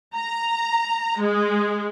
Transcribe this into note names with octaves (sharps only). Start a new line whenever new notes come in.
A#5
G#3